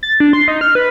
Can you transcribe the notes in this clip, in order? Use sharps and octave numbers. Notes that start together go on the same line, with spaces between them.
A6
D4
C6
D#4
F6
B4